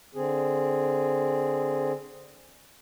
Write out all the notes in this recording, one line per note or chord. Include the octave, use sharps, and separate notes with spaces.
D3 C4 G#4